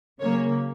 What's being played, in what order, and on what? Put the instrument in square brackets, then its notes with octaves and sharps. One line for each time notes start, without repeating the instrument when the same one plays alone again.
[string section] C#3 F#3 A#3 C#5